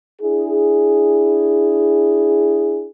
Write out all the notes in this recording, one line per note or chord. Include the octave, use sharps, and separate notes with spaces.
D4 E4 G#4